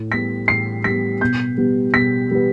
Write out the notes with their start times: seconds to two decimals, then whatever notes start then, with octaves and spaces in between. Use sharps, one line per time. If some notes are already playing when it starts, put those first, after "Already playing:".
Already playing: A2
0.11 G3 B3 B6
0.48 A2 C7
0.84 G3 B3 B6
1.21 B2 G6
1.57 G3 B3
1.94 B2 B6
2.31 G3 B3